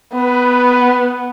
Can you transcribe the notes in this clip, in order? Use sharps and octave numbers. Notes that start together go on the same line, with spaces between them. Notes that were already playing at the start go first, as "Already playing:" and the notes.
B3 B4